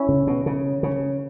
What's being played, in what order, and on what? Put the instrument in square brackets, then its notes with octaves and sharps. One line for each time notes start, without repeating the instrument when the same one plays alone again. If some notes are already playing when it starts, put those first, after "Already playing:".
Already playing: [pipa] C#4 E4
[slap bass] C#3
B2
C#3
C#3